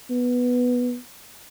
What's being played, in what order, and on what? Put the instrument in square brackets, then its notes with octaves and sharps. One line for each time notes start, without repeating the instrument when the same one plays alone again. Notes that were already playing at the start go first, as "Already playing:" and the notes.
[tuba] B3